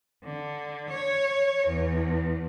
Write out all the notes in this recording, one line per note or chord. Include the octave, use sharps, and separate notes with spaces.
D3
C#5
E2